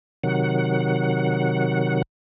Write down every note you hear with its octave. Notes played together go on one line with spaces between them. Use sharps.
C3 D#3 F#3 F#5